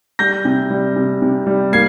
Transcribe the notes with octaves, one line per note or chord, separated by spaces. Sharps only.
G3 G6 A#6
C3
G3
C3
C3
G3
A#3 G#6 C7